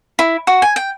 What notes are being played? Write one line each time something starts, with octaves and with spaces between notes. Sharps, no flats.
E4
F#4
G#5
G5